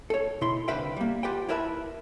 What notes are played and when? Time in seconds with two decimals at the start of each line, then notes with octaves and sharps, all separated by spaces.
0.10 A4 C#5
0.41 B2 E4 C6
0.68 C2 D3 B4 E5 F5 G5
0.96 G3 A#3
1.23 F4 G4 B4 F#5 G5
1.49 E4 A#4 B4 E5 A5 B5